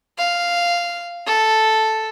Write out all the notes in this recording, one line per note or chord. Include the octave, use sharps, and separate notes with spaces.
F5
A4